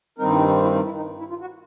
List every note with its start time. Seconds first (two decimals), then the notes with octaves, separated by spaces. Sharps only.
0.19 G2 D#3 G3 C4 D#4 A#4
0.34 E4
0.48 D#4
0.63 E4
0.75 D#4
0.85 E4
0.96 D#4
1.19 E4
1.29 F4
1.41 F#4